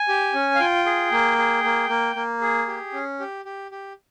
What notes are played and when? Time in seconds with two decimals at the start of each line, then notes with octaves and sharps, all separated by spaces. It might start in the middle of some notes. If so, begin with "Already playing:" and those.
Already playing: G#5
0.08 G4
0.34 C#4
0.55 F5
0.60 F4 G5
0.86 G#4
1.12 A#3
1.38 G#4
1.64 A#3
1.89 A#3
2.16 A#3
2.41 G#4
2.68 G4
2.93 C#4
3.20 G4
3.45 G4
3.71 G4